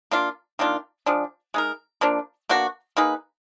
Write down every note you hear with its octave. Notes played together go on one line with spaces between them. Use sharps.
A#3 D4 F4
D#3 A#3 D4 F4
F3 G#3 D4
G#3 D#4 A#4
F3 A#3 D4
B2 A#3 D4 F#4
A#3 D#4 G#4 B4